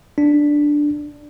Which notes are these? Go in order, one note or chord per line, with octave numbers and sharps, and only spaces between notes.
D4